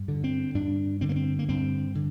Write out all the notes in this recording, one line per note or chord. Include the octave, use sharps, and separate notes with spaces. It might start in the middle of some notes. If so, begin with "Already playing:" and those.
Already playing: G2
D3
C4
G2 D4
D3 C4
A#3
C4
A#3
G2 C4
D3